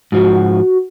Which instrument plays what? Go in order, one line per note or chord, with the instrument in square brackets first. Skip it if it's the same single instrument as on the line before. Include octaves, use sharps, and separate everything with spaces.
[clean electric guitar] G#2 F3 [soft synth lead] F#4